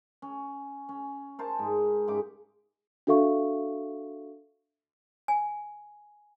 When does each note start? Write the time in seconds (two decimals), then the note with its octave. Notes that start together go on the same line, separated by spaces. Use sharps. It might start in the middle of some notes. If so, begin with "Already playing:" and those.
0.22 C#4
0.89 C#4
1.39 A#4 C5 A5
1.59 G#2 G#5
2.08 G#2 C#3 G4 D6
3.07 D4 F#4 A4 E5 F5 C#6
5.28 G#5